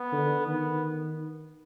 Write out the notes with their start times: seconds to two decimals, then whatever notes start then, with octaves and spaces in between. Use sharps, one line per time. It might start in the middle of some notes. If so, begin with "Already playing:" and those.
Already playing: B3
0.13 D3
0.46 D#3 B3